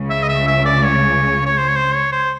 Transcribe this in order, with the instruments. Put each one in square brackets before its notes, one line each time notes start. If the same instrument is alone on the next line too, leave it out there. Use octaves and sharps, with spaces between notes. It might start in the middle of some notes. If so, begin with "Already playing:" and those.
Already playing: [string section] C#2 C#3
[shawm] E5
D#5
E5
E5
D5
C#5
C#5
C5
C#5
C5
C#5
C5